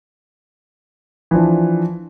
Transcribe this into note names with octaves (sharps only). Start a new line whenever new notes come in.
E3 F3 D4